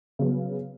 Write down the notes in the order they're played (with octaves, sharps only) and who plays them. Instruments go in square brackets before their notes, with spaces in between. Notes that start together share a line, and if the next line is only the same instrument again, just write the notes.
[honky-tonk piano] C#3 F#3 B3